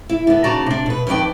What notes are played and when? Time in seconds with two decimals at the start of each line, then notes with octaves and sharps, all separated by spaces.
0.09 E4
0.27 D3 B3
0.44 D#2 C#3 F#4 D5 A5 A#5
0.66 C3 D4
0.86 B2 B4
1.07 F2 D#3 B4 D5 G5